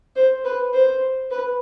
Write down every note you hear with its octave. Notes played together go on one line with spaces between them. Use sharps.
C5
B4
C5
B4